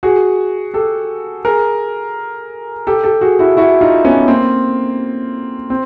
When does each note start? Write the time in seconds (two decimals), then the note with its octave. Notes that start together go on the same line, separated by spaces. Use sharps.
0.03 F#4 G#4
0.74 G4 A4
1.45 G#4 A#4
2.87 G4 A4
3.04 G4 A4
3.21 F#4 G#4
3.39 E4 F#4
3.57 E4 F#4
3.81 D#4 F4
4.05 B3 C#4
4.28 A#3 C4
5.70 C4